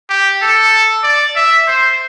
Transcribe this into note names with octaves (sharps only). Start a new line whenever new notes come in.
G4
A4
D5
E5
C5